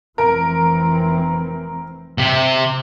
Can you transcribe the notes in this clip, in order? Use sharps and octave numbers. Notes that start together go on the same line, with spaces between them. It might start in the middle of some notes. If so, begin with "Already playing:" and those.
F1 E3 C4 A#4
C3